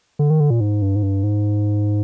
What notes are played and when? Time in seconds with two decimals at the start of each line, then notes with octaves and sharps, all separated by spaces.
0.19 D3
0.30 D#3
0.40 D3
0.50 A#2
0.60 G#2
0.82 G2
0.96 G#2
1.03 G2
1.23 G#2